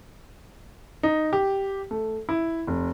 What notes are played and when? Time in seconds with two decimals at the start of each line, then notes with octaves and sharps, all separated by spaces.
1.03 D#4
1.33 G4
1.91 A3
2.29 E4
2.67 F1